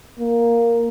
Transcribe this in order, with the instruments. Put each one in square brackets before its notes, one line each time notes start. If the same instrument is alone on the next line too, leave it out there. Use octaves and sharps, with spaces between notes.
[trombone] A#3